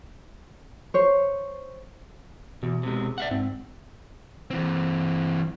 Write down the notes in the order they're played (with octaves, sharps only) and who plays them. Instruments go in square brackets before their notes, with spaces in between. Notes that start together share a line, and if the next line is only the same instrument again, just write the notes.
[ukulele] C5 C#5
[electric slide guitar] E2 [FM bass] B2
[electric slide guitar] C3 G#3
D5 E5 F#5
[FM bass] G#2 [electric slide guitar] C4
[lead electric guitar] E3 C4